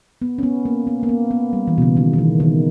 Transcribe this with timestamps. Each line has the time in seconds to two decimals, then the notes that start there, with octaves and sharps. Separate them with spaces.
0.22 B3
0.38 C#4
0.43 B3
0.65 A#3
0.87 B3
1.03 A#3
1.09 B3
1.31 B3
1.53 G3
1.68 E3
1.78 B2
1.82 C#3
1.97 D#3
2.13 D#3
2.18 E3
2.40 D#3